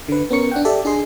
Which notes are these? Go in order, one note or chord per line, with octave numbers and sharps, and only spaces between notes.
D3 B4
B3 C#4 A#4 C#6 C#7
D4 F#5 G5
G4 A4 D5 E5
D4 G#4 D#5 C6